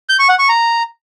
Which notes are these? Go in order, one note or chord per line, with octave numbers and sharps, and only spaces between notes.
G6
C#6
F#5
C#6
A#5